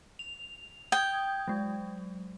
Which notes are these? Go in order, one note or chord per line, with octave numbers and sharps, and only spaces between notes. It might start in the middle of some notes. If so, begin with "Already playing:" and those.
F7
G5 D#6 G6 G#6
F#3 G#3